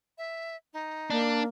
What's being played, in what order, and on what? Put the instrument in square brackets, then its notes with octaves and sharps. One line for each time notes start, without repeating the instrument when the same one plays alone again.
[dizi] E5
D#4
[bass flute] A#3 [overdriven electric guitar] D4